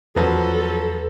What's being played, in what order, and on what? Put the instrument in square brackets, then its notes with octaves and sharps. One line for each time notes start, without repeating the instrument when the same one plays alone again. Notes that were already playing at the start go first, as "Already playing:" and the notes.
[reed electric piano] E2 B4 [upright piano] F3 F#3 [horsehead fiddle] A4